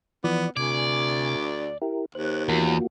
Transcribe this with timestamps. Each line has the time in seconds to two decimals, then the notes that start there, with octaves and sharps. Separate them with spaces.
0.24 E3 F3 B3 D5
0.57 D2 C3 D5 G#5
1.82 E4 G4 A#4
2.15 D#2 C5 F#6
2.49 E2 A#3 F4 F#4